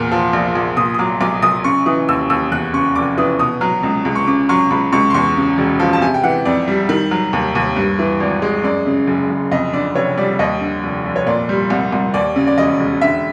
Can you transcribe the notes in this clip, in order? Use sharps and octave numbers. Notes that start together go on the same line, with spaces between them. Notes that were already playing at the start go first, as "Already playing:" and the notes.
Already playing: E2 A#2 F6
F3
A#1
A#1
A#2 D#6
D#6
F#3 D6
B1 D6
B1 D#6
C#3 C#6
E3 D#6
D#2 E6
D#2 E6
E2 F#6
C#3 C#6
F1 D6
E3 D#6
B2 D#6
F#3
C#2
C#2
C#6
C#3 D6
F#3 C#6
C#2 B5
C#2 C#6
C6
E2 C#6
C#3
E1
F3
A5
C3 G#5
G5
E3 F#5
F2 D5
G3
D#3
F#3
D#2
D#2
G2
E3
G#1
G#3
F#2 D5
C#3
F#1
F#1
F2 D#5
D3 D5
F1 C#5
G3 D5
D#2 D#5
D3
F1
F1
C#5
A#2 D5
G3
C2
C2
D#2 D5
C#3
D5
E1 D#5
E1
D3 E5